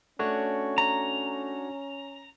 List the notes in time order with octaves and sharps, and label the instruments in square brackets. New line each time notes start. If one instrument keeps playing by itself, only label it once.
[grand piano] A3 [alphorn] C#4 [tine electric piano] D4 F#4 C#5
[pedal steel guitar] A#5